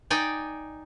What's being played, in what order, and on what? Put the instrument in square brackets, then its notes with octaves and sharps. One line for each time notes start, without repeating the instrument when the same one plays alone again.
[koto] D#4 D5 G5 G#5